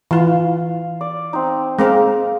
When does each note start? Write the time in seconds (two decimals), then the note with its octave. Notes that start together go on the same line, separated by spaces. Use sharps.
0.11 E3 F4 F5
1.01 D5
1.33 C4 D#4
1.79 G#3 A#3 C4 A#4